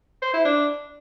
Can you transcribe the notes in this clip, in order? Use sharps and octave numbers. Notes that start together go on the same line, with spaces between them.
C5
E4
D4